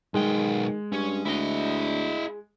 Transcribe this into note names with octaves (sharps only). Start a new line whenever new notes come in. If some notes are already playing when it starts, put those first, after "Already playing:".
B1 D#3 G#3 G5
G2 C#4
D2 E4 D#5